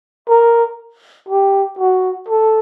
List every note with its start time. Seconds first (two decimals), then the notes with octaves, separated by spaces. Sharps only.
0.29 A#4
1.29 G4
1.79 F#4
2.29 A4